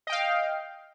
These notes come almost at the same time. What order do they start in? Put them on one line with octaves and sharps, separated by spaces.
D#5 G5 F5